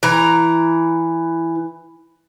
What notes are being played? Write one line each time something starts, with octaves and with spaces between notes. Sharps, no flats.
E3 A#5